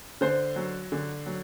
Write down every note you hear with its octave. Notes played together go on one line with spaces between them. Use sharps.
D3 C5
F#3
D3
F#3